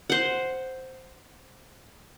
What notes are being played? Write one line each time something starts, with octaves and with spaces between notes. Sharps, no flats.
C5 F#5